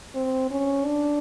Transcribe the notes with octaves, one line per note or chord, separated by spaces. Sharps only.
C4
C#4
D4